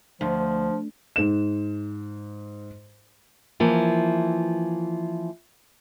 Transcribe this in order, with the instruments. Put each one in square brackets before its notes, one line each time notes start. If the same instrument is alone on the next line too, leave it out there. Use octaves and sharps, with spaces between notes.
[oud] D2 [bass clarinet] F3
[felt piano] G#2 E7
[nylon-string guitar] E3 F3 A#3